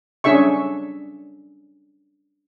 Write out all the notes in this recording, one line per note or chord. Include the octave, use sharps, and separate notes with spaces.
C#4 D4 G#4 E5 C#6